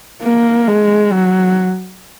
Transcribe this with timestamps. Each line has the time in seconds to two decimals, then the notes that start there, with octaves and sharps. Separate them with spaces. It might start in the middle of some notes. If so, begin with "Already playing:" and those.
0.23 A#3
0.68 G#3
1.12 F#3